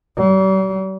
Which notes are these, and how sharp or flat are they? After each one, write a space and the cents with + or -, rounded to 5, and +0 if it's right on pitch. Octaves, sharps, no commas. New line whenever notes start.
G3 -45